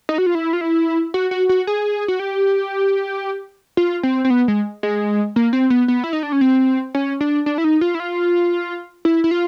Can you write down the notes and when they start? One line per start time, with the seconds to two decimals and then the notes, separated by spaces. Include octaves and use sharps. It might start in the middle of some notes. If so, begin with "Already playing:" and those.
0.09 D#4
0.18 F#4
0.26 F4
0.35 E4
0.53 F4
0.61 E4
1.14 F#4
1.31 F#4
1.49 F#4
1.67 G#4
2.08 F#4
2.20 G4
3.77 F4
4.03 C4
4.25 C4
4.30 B3
4.48 G#3
4.83 G#3
5.36 A#3
5.53 C4
5.70 B3
5.88 B3
6.04 E4
6.13 D#4
6.23 D4
6.32 C#4
6.41 C4
6.95 C#4
7.21 D4
7.46 D4
7.58 E4
7.64 D#4
7.81 F4
7.95 E4
8.00 F4
9.05 E4
9.24 E4
9.31 F4